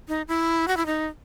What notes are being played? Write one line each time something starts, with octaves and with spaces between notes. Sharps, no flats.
D#4
E4
F#4
E4
D#4